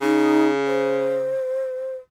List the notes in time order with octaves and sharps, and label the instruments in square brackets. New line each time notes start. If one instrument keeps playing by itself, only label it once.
[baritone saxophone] C#3 [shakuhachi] D#4
[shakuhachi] C5